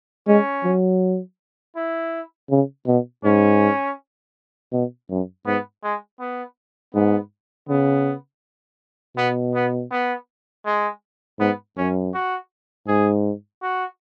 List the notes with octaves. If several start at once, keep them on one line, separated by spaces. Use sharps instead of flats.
G#3 C#4
F#3
E4
C#3
B2
G#2 C#4
B2
F#2
G#2 B3
G#3
B3
G#2 B3
C#3 B3
B2 B3
B3
B3
G#3
G#2 B3
F#2 C#4
F#4
G#2 G#4
F#4